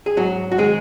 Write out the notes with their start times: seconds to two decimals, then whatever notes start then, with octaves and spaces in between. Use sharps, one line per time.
0.06 G#4
0.17 G#2 F#3 F#4
0.52 F#4
0.58 D#3 G#3 G#4